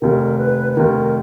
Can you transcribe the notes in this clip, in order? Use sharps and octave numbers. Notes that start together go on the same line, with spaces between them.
F1 D#2 D#3 A#4
B4
B4
F1 D#2 D#3 A#4